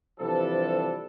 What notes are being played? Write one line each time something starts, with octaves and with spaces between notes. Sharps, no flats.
C3 E3 F3 G3 D4 A4